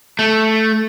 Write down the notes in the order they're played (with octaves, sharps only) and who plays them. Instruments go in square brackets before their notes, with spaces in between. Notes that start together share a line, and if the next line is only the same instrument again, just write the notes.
[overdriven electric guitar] A3